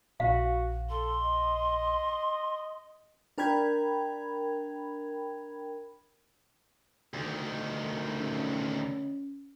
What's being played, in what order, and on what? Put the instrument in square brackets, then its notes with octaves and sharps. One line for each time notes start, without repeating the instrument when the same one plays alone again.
[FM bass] A#1 [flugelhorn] F#4 [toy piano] F5
[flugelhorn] A4 [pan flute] C6
[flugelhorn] D#5
[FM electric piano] D4 A#4 G5 B5 G#6
[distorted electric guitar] D2 D#3
[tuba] C#4